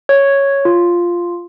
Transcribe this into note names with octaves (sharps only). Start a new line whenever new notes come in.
C#5
F4